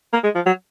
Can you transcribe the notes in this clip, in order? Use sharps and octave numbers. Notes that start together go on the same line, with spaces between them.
A#3
G#3
F3
F#3